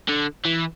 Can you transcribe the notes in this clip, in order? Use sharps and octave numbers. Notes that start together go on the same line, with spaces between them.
D3
E3